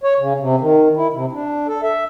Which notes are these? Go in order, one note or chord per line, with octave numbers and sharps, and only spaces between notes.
C#5
C#3
C3
D#3
E4
C3
D4
A4
E5